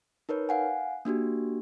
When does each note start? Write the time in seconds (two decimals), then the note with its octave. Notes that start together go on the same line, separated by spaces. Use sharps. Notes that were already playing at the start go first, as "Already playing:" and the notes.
0.29 D#4 A#4 B4 C#5
0.49 F5 F#5 G#5
1.05 A#3 D4 F#4 G4